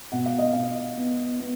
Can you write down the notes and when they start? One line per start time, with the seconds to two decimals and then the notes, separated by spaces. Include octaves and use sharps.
0.12 B2 F#5
0.26 F5
0.38 D#5
0.53 B2 F5
0.97 B3
1.40 B3